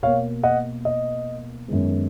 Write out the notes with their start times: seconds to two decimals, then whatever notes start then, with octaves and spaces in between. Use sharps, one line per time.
0.03 B2 A#3 C#5 F5
0.43 D#5 F#5
0.85 D#5
1.68 F#2 D#3 G#3 B3